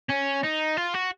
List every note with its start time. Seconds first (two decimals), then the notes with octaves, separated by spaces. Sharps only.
0.09 C#4
0.43 D#4
0.77 F4
0.94 F#4